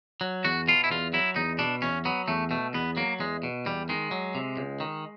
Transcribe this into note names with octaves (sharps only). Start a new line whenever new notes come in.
F#3
E2 F#4
B2 F4
E4
E2 F4
F#3 E4
E2 D#4
B2 D4
E2 C#4
F#3 B3
E2 A3
B2 A3
E2 B3
F#3 A#3
E2 G#3
B2
E2 G3
D#3 G#3
F#3
C3
C#2
D#3